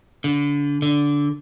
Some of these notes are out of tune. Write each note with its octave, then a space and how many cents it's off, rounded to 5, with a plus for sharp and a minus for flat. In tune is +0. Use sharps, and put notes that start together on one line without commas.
D3 -30
D3 -15